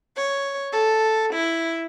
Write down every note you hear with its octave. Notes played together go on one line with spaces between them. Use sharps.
C#5
A4
E4